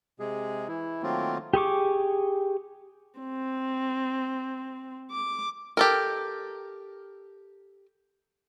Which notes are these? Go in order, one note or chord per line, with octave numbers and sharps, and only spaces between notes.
C3 G#3 G#4
E3 E4
D#3 F#3 A3 A#3 C4 F4
G4 G#4 C#6 D6
C4
D6
G4 A4 A#4